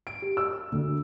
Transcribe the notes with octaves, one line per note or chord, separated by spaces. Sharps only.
D7
G4
E6
D2